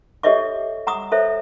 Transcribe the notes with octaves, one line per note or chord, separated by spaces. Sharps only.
G4 A4 C#5 D#5 E5 D6
F#5 A#5 D6 D#6
A4 C5 C#5 E5